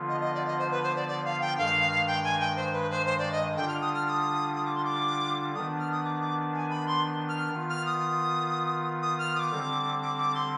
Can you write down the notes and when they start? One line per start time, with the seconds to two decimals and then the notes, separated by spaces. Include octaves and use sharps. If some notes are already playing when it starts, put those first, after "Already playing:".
Already playing: D3 F3 B3 F4
0.09 D#5
0.21 D#5
0.34 D5
0.47 D#5
0.59 C5
0.71 B4
0.83 C5
0.96 D5
1.08 D5
1.24 F5
1.41 G5
1.58 G2 D#3 G#3 F5
2.07 G5
2.24 G#5
2.40 G5
2.57 C5
2.73 B4
2.90 C5
3.06 C5
3.18 D5
3.32 D#5
3.56 D3 G3 D4 F4 G5
3.68 F6
3.81 D#6
3.94 F6
4.06 F6
4.09 D#6
4.56 D#6
4.65 D6
4.75 C6
4.85 D6
5.55 D#3 B3 D4 D#6
5.80 F6
5.92 D#6
6.04 D6
6.21 D6
6.54 G#5
6.70 B5
6.87 C6
7.29 F6
7.53 D#3 B3 F4
7.70 F6
7.86 D#6
9.03 D#6
9.18 F6
9.35 D#6
9.40 D6
9.52 D3 G3 C4
10.02 D6
10.18 D6
10.35 C6